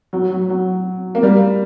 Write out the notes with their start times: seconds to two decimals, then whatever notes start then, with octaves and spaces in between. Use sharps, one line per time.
0.13 F#3
0.31 F#3
0.50 F#3
1.15 A#3
1.23 G3